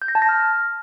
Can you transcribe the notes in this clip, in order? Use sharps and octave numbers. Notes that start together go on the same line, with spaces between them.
G6
A#6
A5
A#6
F6